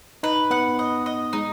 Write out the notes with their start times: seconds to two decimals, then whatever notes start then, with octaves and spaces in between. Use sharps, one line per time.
0.23 D#4 B4
0.51 B3 F#5
0.79 D#5
1.06 D#5
1.33 G#3 D#4